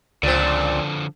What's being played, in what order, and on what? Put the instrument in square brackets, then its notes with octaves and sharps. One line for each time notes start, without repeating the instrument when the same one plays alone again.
[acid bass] C#2 [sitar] A#2 C4 [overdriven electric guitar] D3 F3